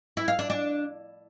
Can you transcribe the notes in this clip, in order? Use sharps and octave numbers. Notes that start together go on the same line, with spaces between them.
E4
F5
D4
D4